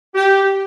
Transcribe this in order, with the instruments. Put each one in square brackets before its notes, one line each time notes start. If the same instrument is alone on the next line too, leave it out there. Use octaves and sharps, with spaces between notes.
[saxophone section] G4